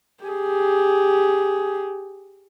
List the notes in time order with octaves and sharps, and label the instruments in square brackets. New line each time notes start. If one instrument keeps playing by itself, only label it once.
[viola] G4 G#4